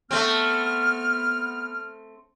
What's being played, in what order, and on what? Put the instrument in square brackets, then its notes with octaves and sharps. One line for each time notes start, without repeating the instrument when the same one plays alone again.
[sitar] A3 C4 [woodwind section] B3 F6